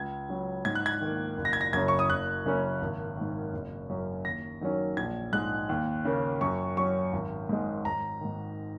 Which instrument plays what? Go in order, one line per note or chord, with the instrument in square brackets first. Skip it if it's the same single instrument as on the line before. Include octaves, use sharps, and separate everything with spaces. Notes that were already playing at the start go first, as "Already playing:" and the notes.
Already playing: [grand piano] C#2 G#6
C#3 F#3
G#2 G#6
F#6
G#6
D#3 A#3
F#1
A#6
G#6
A#6
F#2 C#3 G#6
C#6
D#6
F#1 F#6
F#2 C#3 A#3 C#4
G#1
G#2 D#3
F#1
F#2 F#3 C#4
D#2 A#6
D#3 F#3 A#3 C#4
A#1 G#6
G#2 G#3 F#6
D#2
C#3 A#3
F#2 C#6
F#3 C#4 C#6
G#1
G#2 G#3
G#1 A#5
G#2 D#3